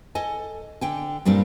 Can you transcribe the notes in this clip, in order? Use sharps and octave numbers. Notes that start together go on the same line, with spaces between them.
A4 D#5 G#5
D3 G5 G#5
G2 A#2 G3 C4 D4